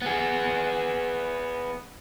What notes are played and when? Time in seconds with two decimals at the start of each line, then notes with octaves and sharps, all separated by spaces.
0.02 B3 G#4